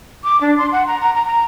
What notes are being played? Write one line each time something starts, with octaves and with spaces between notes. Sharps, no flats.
D6
D4
C6
F#5
A#5
A#5
A#5
A#5